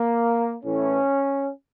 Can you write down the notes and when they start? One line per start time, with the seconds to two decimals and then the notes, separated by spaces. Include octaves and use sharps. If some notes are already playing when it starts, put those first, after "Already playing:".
Already playing: A#3
0.64 A2 E3 A3 C#4